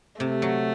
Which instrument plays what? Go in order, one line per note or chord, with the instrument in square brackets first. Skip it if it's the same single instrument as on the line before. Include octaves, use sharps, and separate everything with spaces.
[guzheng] C3 [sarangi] A3
[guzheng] F#3